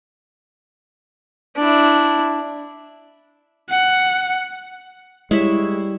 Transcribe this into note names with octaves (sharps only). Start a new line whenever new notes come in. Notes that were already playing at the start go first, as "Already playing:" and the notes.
D4 E4
F#5
G3 G#3 E4 C#5 E5